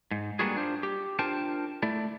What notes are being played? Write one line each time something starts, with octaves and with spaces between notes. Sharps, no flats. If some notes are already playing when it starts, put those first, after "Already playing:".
G#2
G3 A#3 B3 D4 F#4 G#4
D4 F4 C5
G4
D4 F4 A#4 C5 G5 A5
A3 E4 D5